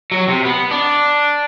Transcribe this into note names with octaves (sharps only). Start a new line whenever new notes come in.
F#3
C3
B3
D4